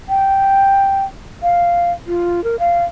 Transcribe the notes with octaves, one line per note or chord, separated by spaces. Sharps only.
G5
F5
F4
A#4
F5